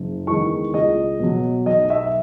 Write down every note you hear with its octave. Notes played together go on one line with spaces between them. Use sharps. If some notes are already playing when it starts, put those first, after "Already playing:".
Already playing: F#1
E2 D#3 G#3 C#6
C#2 D#5
B2 F#3
B1 D#5
E5